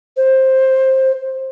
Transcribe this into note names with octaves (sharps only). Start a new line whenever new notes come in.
C5